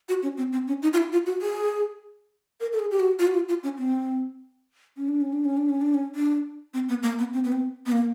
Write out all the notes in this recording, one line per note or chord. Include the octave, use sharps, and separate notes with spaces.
F#4
C#4
C4
C4
C#4
D#4
F4
E4
F4
F#4
G#4
A#4
A4
G#4
G4
F#4
F4
F#4
F4
F4
C#4
C4
C#4
D4
C#4
D4
C#4
D4
C#4
D4
C#4
D4
C4
B3
A#3
B3
C4
B3
C4
B3
A#3